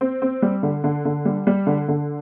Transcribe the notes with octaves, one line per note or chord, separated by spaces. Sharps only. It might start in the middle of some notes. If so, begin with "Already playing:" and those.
C4
C4
G3
D3
D3
D3
G3
G3
D3
D3